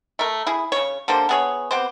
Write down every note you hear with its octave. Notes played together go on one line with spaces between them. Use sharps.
A3 A#4
E4 G#4
C#3 C#5
D3 G3 A#3 C5
B3 G#4 C#5
B3 C4 G4 C5